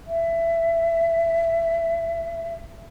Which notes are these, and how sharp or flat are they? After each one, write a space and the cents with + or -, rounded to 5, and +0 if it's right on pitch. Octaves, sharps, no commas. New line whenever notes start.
E5 +20